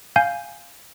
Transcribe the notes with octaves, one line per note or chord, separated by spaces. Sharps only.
F5 G#5 G6